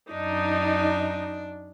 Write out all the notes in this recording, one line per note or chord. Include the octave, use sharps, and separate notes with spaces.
F#2 D4 D#4